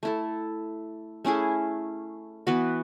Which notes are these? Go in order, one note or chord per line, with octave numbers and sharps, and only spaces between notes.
A3 E4 A4
A3 C#4 E4 G#4
E3 B3 F#4 B4